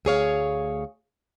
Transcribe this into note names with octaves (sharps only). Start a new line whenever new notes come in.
D2 G#4 C#5 F5